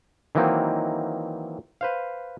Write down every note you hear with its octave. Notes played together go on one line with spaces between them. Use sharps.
D#3 E3 F#3 A#3 C4 D#4
B4 C5 F5